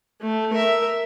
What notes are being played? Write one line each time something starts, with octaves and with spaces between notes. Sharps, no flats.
A3
A#4 E5